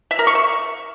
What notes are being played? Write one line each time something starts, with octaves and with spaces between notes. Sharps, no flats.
E5
A#4
C#6
E5